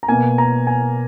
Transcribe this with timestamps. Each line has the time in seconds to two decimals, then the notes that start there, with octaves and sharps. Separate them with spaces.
0.03 A#5
0.08 B2 A#3 G#5
0.38 A#5
0.67 G#5